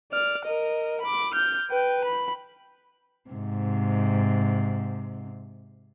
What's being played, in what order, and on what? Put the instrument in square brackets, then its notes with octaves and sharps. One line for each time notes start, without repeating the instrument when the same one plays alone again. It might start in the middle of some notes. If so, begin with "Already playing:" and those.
[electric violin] D5 F6
A#4 D#5
B5 D6
F6 G6
B4 G5
B5
[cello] G#2 C3